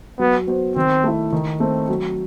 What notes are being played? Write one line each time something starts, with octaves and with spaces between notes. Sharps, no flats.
F#3 B3
B3 F#4 C5
D#3 C4
A3 E4
D#3
A3 C4
F#3